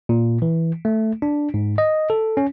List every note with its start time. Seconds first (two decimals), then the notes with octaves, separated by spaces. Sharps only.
0.09 A#2
0.42 E3
0.85 A3
1.22 D4
1.54 G#2
1.78 D#5
2.10 A4
2.37 C#4